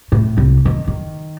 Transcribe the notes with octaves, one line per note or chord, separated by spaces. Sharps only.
A2
C2
D#3
D#3